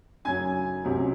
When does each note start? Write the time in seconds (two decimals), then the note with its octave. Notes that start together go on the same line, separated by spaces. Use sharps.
0.25 F#2 C#3 F#3 G#5 G#6
0.84 C#2 C3 F#3